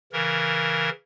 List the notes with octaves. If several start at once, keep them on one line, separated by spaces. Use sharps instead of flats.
C#3 E3 A#4